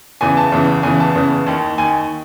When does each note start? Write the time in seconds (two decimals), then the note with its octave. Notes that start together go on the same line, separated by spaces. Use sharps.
0.21 E2 C#3 E3 G#5
0.37 A5
0.52 E2 C#3 E3
0.83 E2 C#3 E3 G#5
1.00 A5
1.15 E2 C#3 E3
1.46 D#2 D#3
1.78 D#2 D#3 G#5